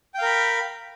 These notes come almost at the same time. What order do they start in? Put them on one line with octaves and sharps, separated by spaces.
G5 F5 A#4 B5